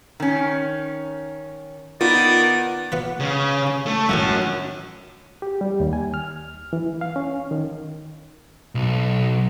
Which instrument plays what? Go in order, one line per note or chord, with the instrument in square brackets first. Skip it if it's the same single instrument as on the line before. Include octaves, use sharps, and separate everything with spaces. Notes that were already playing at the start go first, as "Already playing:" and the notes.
[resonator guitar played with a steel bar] D#3 C#4
[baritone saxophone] D#3 [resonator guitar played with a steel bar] B3 [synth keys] F4 [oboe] D5
[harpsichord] B3 F4 B4
[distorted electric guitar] C#3
A3
[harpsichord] F#2 A2 D#3 [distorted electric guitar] C#4 F#4
[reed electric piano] G4
G3
D#2
G#5
F6
E3
F5
C#4
D#3
[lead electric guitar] B1